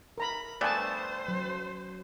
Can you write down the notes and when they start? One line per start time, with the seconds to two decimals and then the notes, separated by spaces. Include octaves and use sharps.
0.18 A#4 A#5 B5
0.61 G2 A3 B3 C5 D5 G#5 A5
1.28 F#3